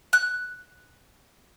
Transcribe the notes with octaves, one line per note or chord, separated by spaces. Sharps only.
F#6